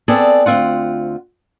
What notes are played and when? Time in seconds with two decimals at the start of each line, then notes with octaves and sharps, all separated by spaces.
0.08 B3 C4 G#4 A4 D5 A5
0.46 D2 C3 C4 F4 F#5